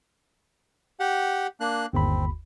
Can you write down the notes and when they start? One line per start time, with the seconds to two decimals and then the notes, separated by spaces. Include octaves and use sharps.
1.00 G4 F#5
1.60 A#3 D4 F#6
1.93 G1 D#2 C4 B5